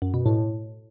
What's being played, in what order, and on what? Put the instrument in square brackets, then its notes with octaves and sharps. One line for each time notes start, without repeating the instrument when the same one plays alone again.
[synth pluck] F#2
B2
A2